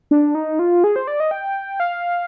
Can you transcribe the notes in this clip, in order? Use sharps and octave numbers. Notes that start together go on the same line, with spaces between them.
D4
D#4
F4
G#4
C5
D5
D#5
G5
F5